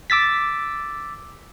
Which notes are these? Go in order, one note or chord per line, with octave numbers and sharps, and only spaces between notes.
D6 E6 A6 B6